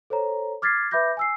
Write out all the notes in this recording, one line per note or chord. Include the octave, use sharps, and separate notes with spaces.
A4 C5 C#5 A#5
D6 F6 G#6 A6 B6 C7
B4 E5 B5 D6 G6 A#6
G#5 E6 C7